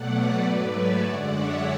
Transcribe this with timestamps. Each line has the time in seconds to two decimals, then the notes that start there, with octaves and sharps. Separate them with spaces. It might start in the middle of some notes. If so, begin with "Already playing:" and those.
Already playing: B2 F#3 A3 D5 F#5
0.11 B4 D5
0.40 G#2 F#3 A3 B4 D5
0.70 C#5 E5
1.00 F#2 D3 G#3 D5 F#5
1.30 C#5 E5